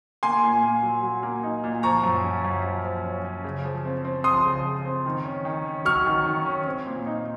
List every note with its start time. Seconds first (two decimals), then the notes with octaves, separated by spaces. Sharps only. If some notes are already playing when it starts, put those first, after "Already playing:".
0.23 A#3 G#5 C6
0.43 A#2
0.63 A#3
0.83 F#3
1.03 F#3
1.23 A#3
1.43 D#4
1.64 A#2
1.83 F3 A#5 C#6
2.04 F#2
2.24 C#4
2.45 F#2
2.64 F3
2.84 F3
3.04 C#4
3.24 C#4
3.44 C#3
3.65 F3
3.85 C4
4.05 C4
4.24 F3 C6 D#6
4.45 C#3
4.65 F3
4.85 C4
5.06 D#3
5.25 C#4
5.45 D#3
5.65 C#4
5.85 F#3 C#6 F6
6.06 D#3
6.26 D#3
6.45 C#4
6.66 C4
6.86 A#2
7.06 D#4